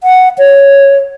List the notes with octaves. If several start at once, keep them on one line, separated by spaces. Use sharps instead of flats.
F#5
C#5